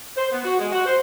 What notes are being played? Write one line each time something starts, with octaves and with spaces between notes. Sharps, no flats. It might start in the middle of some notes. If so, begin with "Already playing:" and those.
C5
B3
F#4
G#3
F#4
C5